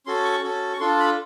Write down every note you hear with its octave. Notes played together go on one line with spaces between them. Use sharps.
C#4 F#4 A4 C6
C#6
C#4 F#4 A4
C#6
D4 F4 A4 C6
B5